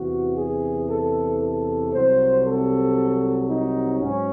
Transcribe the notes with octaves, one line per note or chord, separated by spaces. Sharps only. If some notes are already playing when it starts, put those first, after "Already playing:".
Already playing: E2 C3 E3 F#4
G#4
A4
A4
C2 C3 F#3 C5
A4
D#4
G#2 F#3 C#4